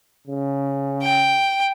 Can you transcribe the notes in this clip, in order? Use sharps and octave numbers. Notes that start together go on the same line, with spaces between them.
C#3
G5